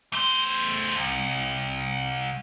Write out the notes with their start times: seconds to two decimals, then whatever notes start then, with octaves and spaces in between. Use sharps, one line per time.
0.13 A3 C5
0.96 C2